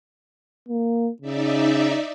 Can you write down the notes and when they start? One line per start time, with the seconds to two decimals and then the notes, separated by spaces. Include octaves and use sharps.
0.68 A#3
1.22 C#3 D#4 D5 E5